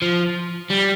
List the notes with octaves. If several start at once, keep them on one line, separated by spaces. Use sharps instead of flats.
F3
G3